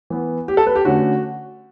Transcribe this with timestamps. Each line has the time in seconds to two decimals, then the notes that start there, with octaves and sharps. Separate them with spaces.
0.10 E3 B3
0.48 G4
0.57 A4
0.67 B4
0.75 G4
0.85 D3 A3 C#4 F#4